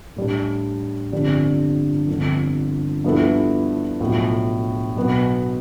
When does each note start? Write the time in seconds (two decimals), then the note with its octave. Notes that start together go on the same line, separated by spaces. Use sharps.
0.16 A2 G3 D4
1.12 G1 F2 D3 G3 D4
2.08 G1 F2 D3
3.04 G2 F3 B3 E4 A4
4.00 B1 A2 F3
4.96 B1 B2 B3